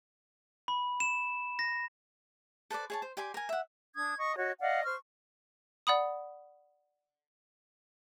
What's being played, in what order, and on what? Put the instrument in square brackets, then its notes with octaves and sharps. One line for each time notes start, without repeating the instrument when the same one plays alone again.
[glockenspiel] B5
E7
A#6
[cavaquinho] A4 B4 C5 D5
G#4 C#5 A5
C5
G4 D5 G#5 C6
A#4 G#5
E5 F#5
[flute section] D4 D#6 G#6
D#5 C#6
F#4 C#5 D#5
D5 D#5 F5 F#5
C5 C#6 F6
[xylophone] D5 F#5 B5 D#6